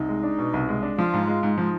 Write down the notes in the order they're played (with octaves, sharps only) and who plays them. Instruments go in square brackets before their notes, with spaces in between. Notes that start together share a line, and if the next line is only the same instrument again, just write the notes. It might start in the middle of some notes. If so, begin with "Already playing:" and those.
Already playing: [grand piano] C2 [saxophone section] D#4
[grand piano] G#3
D4
B2
C2
G#3
D4
[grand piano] F3 [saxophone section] F4
[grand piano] G#2
G#3
G#2
[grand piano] F3 [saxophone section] D#4